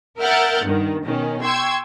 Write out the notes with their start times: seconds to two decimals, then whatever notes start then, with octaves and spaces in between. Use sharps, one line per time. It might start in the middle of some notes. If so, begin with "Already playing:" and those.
0.19 A#4 E5 F#5 F6 G6 A6
0.64 G2 D#3
1.05 B2 D#3 C#4
1.43 G5 C6 C#6 E6 G#6